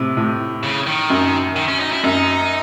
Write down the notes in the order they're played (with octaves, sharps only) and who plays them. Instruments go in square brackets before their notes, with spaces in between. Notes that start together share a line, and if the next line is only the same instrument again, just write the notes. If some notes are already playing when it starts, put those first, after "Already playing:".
Already playing: [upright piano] A2 C3
A2
[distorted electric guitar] C#3
D#3
[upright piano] F#2
[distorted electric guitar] D#3
C#4
D#4
E4
[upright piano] F#2 [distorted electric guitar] D#4